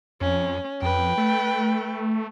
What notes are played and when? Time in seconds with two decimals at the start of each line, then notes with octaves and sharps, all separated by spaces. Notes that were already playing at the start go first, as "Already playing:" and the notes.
0.21 F2 C#4
0.82 F2 B4 G5
1.18 A3